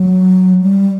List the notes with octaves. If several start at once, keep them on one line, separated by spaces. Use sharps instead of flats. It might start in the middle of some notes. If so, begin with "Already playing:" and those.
Already playing: F#3
G3